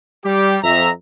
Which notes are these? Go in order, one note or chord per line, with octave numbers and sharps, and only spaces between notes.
G3 G4
F2 E5 A#5